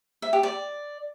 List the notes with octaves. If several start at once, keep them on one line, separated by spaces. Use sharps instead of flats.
E5
G4
D5